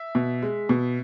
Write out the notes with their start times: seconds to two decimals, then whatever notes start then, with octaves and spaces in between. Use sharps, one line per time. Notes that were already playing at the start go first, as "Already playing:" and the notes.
Already playing: E5
0.15 B2
0.42 G#3
0.69 B2